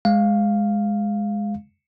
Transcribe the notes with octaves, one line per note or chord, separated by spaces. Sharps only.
G#3 F5